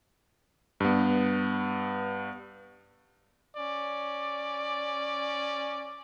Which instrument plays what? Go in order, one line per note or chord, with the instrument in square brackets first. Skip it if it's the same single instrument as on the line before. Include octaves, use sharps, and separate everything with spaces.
[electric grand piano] G2 B3
[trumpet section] C#4 D5